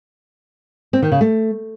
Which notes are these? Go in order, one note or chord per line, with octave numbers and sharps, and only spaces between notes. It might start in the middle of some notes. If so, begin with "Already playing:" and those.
C4
D#3
C#3
A3